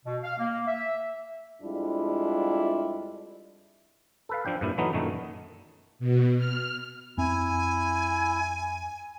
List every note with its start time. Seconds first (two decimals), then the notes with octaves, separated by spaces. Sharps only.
0.06 B2
0.24 F5
0.39 A#3
0.67 E5
1.62 F2 G3 G#3 D4 E4 F4
4.29 A4 B4 F5
4.45 F3 D4 G5
4.61 G2 A#2 E4
4.78 E3 F#3 A3 B3 D#4
4.93 F#2 A#2 D#3 A3
5.99 B2
6.37 F6
7.18 F2 C4 E4 G#5